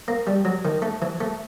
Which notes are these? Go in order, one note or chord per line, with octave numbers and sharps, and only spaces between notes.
A#3
G3
F#3
D#3
A3
E3
A3